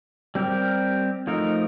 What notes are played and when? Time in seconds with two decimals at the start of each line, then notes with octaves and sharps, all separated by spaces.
0.35 G3 C4 G4 A#4
1.27 F3 A3 D#4 A#4